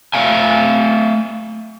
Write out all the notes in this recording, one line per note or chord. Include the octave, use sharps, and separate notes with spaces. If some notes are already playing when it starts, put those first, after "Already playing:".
A3 E5 F5 G#5